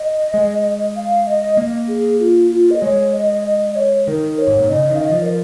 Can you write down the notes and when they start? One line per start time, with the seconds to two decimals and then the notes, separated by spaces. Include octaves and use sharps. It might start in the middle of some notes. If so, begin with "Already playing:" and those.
Already playing: D#5
0.34 G#3
0.96 F5
1.27 D#5
1.57 A#3
1.88 G#4
2.20 F4
2.51 F4
2.71 D#5
2.82 G#3 C#5
3.13 D#5
3.45 D#5
3.71 D#5
3.76 C#5
4.07 D#3 A#4
4.38 C#5
4.48 G#2
4.59 A#2
4.69 C#3 D#5
4.90 D#3
4.95 F5
5.00 D#5
5.11 F3
5.22 A#4